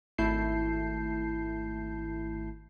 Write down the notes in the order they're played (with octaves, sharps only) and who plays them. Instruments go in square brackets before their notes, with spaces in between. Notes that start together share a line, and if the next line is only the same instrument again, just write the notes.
[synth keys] G#1 A3 E4 A5 G6 C7